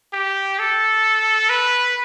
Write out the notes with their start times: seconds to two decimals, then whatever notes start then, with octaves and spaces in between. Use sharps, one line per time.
0.13 G4
0.59 A4
1.49 B4